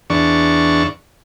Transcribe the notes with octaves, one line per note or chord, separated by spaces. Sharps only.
E2 D4 C#6